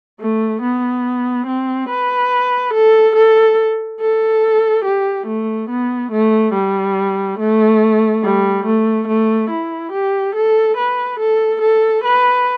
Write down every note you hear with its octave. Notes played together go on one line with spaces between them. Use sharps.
A3
B3
C4
B4
A4
A4
A4
G4
A3
B3
A3
G3
A3
G3
A3
A3
E4
G4
A4
B4
A4
A4
B4